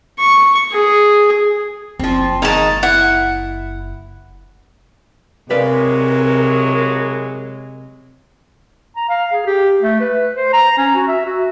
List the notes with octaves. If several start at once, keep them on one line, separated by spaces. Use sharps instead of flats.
C#6
G#4
F#1 F3 C4
D#3 G#3 D#4 F5 A5
E4 F#5
B1 C3 F#3 G#3 A#4 B4 D5 F5
A#5
F5
G#4
G4
A3
B4
C5
A#5
C#4
F#4
E5
F#4